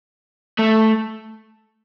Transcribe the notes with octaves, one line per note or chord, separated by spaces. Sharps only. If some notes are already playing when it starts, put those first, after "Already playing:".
A3